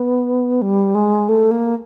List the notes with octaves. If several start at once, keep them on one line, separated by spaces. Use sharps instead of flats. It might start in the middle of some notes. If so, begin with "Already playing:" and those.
Already playing: B3
G3
G#3
A3
A#3